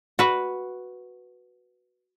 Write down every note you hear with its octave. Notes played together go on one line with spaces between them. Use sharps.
F#4 B4